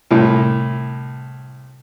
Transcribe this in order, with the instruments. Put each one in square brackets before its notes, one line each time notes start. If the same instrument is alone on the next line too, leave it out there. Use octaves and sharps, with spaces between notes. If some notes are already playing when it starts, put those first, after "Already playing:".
[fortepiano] C2 A2